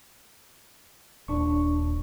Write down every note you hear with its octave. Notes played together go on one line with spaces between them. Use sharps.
D#1 D4 C#6